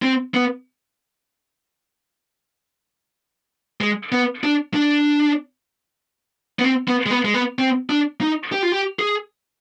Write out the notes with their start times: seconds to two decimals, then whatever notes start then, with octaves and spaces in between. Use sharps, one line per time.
0.02 C4
0.34 B3
3.81 G#3
4.12 B3
4.44 D4
4.74 D4
6.59 B3
6.64 C4
6.88 B3
7.06 G#3
7.10 B3
7.25 G#3
7.34 B3
7.59 C4
7.90 D4
8.21 D#4
8.52 G4
8.63 F4
8.72 G4
8.99 G#4